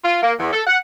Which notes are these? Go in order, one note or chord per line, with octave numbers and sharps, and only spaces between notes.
F4
A#3
E2
A4
F#5